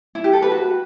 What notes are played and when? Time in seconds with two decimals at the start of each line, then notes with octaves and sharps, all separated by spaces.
0.15 E4
0.24 G4
0.33 A4
0.42 B4
0.52 F#4